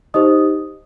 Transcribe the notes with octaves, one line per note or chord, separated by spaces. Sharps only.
D#4 G4 C5 D#5 D#6